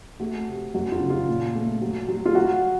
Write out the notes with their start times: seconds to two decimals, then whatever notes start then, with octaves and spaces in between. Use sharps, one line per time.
0.20 A3 F#4
0.47 C3
0.74 F#2 F#4
0.92 F4
1.00 C#3
1.10 F4
1.28 A#2
1.55 A3
1.82 F#3
2.08 F#3
2.26 F4
2.35 F#3 F#4